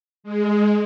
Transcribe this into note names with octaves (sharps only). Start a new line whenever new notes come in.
G#3